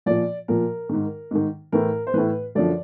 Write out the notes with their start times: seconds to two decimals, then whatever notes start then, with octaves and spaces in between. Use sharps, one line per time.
0.06 A#2 F3 D5
0.48 A#2 F3 A#4
0.89 G#2 D#3
1.31 G#2 D#3
1.72 A2 E3 A#4
2.07 C5
2.14 A2 E3 B4
2.55 F#2 D3 F3 D5